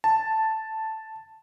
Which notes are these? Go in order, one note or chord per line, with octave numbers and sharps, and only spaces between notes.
A5